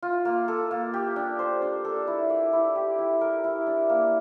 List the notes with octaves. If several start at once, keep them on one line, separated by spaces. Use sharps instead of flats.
F4
A#3
A4
A#3
G4
D4
C5
D4
A4
E4
D5
E4
G4
E4
A#4
E4
D4
A#3